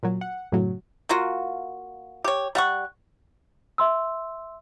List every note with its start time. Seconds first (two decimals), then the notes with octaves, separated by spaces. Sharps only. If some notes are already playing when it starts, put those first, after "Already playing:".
0.03 A#2 F#3
0.21 F#5
0.52 F#2 A2 C#3 F#3
1.09 A#3 F4 F#4
2.24 G4 C#5
2.55 G3 F#5 C#6
3.78 E5 C6 E6